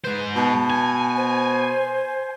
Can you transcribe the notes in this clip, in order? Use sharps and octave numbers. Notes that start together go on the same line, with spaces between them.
G#2 B4 C5
B2 A5
G#5
C5